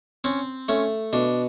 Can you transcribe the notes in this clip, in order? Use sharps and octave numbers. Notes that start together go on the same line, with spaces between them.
C4 C#4
A3 C#4
B2 D4